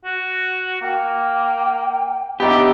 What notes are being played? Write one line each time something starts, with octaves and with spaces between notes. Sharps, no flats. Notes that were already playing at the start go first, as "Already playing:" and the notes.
F#4
A#3 G5
B3 D4 D#4 G4 E5